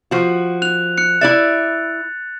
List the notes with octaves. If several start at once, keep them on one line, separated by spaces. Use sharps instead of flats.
F3 F#4
F#6 F7
F#6 C#7
E4 D5 E5 A6